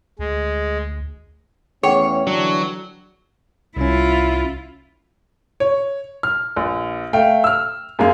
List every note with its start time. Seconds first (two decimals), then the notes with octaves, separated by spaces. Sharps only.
0.19 D2 G#3
1.83 E2 A3 C#4 G#4 C#5 F#5 G5
2.27 D3 E3 F#3 D4
3.77 C2 C#4 E4 F4
5.60 C#5
6.23 F6
6.56 A#1
7.13 A3 F5 G5
7.44 E6 F6
7.99 F#2 G#3 A#3 F5